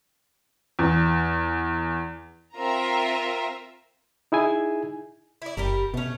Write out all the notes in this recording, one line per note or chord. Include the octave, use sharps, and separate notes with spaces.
E2
C4 F4 A#4 E5 A#5
D#4 E4 G#4 G#5
E4 D5
F#1 G3 G4 A#4
B2 A3 C#4